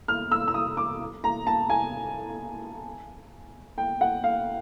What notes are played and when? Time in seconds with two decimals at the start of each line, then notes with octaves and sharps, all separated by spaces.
0.08 F6
0.31 E6
0.48 E6
0.54 D#6
0.77 D6
1.24 A#5
1.47 A5
1.70 G#5
3.78 G5
4.01 F#5
4.24 F5